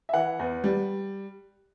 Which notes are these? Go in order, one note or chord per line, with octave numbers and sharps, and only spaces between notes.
E5
E3 F#5
E2
G3